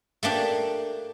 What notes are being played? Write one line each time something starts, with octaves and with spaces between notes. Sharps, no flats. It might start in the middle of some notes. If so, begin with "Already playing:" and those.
A3 A#3 D4 G4